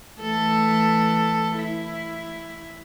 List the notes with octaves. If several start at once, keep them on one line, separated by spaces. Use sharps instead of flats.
E3 A3 A4
E4